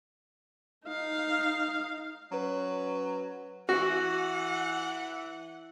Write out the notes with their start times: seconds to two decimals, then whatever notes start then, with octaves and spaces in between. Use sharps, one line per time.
0.86 D#4 F5
2.32 F#3 C#4 B4
3.69 E3 F#4 F#5